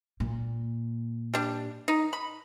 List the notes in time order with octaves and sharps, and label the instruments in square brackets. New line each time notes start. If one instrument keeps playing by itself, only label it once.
[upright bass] A#2
[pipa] G3 D4
D#4
B5